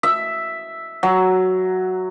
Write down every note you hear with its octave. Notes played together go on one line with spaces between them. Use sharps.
E5
F#3